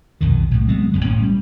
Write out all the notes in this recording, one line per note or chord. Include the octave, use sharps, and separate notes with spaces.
B1 F2 D#3
C2 A2
F#3 G#3 B3 C4
F#1 F#2 D3
A1 A2 C#4
G3